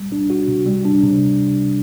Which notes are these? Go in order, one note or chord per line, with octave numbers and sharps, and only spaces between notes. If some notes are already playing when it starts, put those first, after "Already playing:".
Already playing: G3
D4
F#4
C3
G3
D4
C3